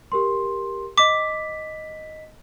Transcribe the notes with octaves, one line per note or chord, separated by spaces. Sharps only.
G4 A#4 C6
D#5 D6 B6